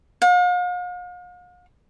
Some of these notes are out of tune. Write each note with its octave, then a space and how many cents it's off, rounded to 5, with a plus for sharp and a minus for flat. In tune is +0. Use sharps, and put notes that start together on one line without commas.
F5 +45